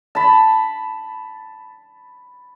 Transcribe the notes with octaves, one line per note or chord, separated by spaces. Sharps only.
A5 B5